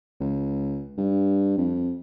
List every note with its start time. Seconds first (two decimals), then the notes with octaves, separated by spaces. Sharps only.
0.20 C#2
0.97 G2
1.57 F2